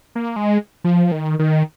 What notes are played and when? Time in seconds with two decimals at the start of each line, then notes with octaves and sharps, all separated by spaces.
0.15 A#3
0.36 G#3
0.84 F3
1.12 D#3
1.39 D#3